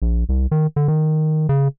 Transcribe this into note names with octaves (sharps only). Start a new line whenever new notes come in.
A#1
C2
D#3
D3
D#3
C#3